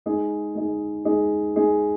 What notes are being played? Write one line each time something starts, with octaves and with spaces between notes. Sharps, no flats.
G#3 D#4 G#4
G#3 D#4 G#4
G#3 D#4 G#4
G#3 D#4 G#4